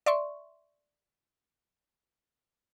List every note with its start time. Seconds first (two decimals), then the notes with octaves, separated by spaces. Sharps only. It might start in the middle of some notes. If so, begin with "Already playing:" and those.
0.06 D5 E5 C6 C#6